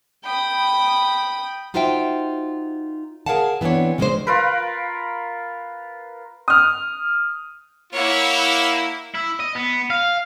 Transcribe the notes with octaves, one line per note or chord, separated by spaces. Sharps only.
G5 B5 D#6
D#4 F4 F#4 C5 E5 G5
G#4 A#4 C#5 F5 F#5 A5
E3 B3 C4 D4 C#5
C#3 F3 G#3 C#4 D4 C5
F4 A#4 B4
D#6 F6
A#3 E4 C#5 F#5
E4
D#5
B3
F5